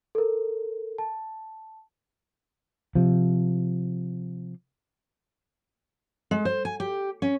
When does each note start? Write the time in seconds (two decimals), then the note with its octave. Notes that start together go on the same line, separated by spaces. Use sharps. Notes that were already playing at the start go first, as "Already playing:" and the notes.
0.15 A4 A#4
0.98 A5
2.95 C3 F3
6.31 G#3
6.45 C5
6.65 G#5
6.80 G4
7.22 C#4